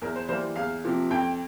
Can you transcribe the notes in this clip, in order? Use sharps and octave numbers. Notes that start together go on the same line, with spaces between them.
E2 A#4
C5
E3 G3 A#3 C5
E2 F5
C3 F3 A#3
F2 G5